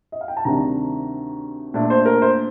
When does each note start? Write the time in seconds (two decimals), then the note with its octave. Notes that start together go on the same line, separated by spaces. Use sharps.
0.12 D#5
0.21 F5
0.28 G5
0.37 A5
0.45 D2 C3 D#3 G3 D4 A#5
1.74 A#2 A3 D4
1.90 C5
2.06 A#4
2.22 C5